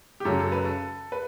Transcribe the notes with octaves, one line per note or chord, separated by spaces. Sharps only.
G4
F#2 C#3 F#3 A4
A4
B4
A4
B4